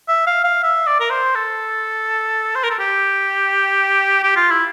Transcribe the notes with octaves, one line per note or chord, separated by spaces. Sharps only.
E5
F5
F5
E5
D5
A#4
C5
A4
C5
A#4
A4
G4
G4
F4
E4